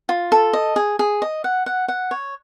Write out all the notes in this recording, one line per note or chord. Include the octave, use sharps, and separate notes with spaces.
F4
A4
D#5
G#4
G#4
D#5
F#5
F#5
F#5
C#5